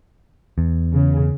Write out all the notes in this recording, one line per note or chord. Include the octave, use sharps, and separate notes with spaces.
E2
C#3